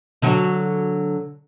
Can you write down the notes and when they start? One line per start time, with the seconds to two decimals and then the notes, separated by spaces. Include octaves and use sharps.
0.22 D3 F#3 F#4